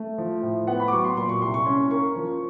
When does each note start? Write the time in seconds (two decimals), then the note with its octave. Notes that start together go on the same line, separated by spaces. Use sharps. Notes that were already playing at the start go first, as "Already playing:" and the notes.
Already playing: A3
0.18 F3
0.43 A2
0.67 B3 F#5
0.80 B5
0.88 D6
0.92 F#3 C#6
1.04 C6
1.17 A#2 C6
1.29 C#6
1.42 C2 C6
1.54 C#6
1.66 C#4 C#6
1.91 A#3 C#6
2.16 F3